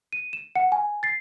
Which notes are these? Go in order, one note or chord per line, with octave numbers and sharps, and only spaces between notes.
D#7
E7
F#5 C#7
G#5
A6 C7